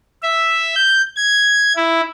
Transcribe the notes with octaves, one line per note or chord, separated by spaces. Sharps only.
E5
G6
G#6
E4